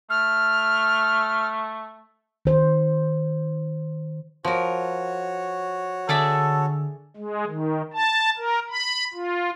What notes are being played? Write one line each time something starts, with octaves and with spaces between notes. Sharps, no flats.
A3 F6
D#3 C5
F3 F#4 A#4 C#5
D3 G#4 A4 D5 E5
G#3
D#3
A5
A#4
B5
F4